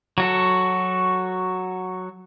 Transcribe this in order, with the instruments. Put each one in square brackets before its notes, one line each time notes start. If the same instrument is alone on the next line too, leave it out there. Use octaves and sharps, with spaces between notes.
[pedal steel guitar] F#3 F#4 A4